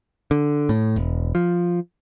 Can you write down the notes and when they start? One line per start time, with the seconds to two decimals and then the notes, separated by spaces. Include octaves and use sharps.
0.31 D3
0.69 A2
0.96 E1
1.35 F3